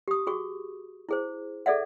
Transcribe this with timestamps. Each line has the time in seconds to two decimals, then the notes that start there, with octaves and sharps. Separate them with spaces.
0.08 G4 D#6
0.27 F#4 G#4 C#6
1.09 E4 G#4 C5
1.66 G#4 A4 D5 E5 F#5